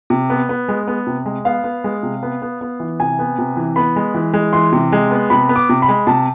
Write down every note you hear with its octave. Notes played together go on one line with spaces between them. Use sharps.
C3
B3
B3
G#3
B3
C3
G#3
B3 F5
B3
G#3
C3
B3
B3
B3
E3
C3 G#5
B3
C3
E3
B3 B5
G#3
E3
G#3
E3 C6
C3
G#3
B3
C3 B5
B3
D6
C3
B5
G#3
C3 A5